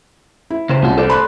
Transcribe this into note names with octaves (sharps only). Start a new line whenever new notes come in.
E4
C#3 C5
C2 C#4 F4 F#4
A4 C5 D5
B5 C6 F#6